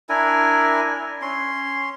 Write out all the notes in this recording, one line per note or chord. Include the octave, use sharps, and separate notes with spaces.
D4 E4 A#4 G#5
C#4 C6